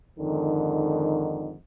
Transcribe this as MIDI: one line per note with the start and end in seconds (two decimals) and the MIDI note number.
0.19 1.56 41
0.19 1.56 44
0.19 1.56 50
0.19 1.56 51